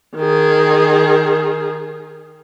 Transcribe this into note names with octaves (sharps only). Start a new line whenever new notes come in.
D#3 G#4